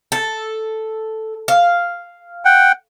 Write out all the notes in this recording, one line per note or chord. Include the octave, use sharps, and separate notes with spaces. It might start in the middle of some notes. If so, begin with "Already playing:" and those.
A4
F5
F#5 G5